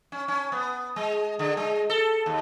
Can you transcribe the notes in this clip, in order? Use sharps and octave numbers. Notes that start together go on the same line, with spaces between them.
C#4
C#4
B3
G#3
D3
G#3
A4
D#2